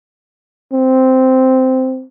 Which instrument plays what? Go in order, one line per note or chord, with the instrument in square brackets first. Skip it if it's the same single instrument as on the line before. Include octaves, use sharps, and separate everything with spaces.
[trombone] C4